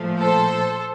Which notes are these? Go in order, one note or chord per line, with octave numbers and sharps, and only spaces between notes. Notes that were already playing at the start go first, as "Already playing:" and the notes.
Already playing: A#2 F3 A3
A4 C5